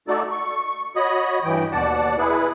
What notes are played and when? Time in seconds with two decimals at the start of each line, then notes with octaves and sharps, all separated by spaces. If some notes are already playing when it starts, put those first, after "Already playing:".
0.08 A3 D#4 F#4 A4 D5
0.31 C#6
0.96 F#4 C#5 D#5 B5 D#6
1.44 G2 E3 G5
1.72 D#2 B2 D5 F#5 A5
2.18 E4 G#4 B4